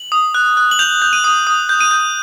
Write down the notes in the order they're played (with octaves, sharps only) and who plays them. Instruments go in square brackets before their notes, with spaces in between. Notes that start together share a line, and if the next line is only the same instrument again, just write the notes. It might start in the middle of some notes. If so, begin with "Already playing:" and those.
Already playing: [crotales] F#7
D#6
F#6
F#6
F#7
G6 F7
G6
D#7
D#6
D#6
G6
D#7
G6